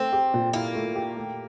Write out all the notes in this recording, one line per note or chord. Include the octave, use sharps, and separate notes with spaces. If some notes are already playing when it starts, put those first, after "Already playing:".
Already playing: A3 C4
G4
A#2
A#3 E4
A3
G4
A3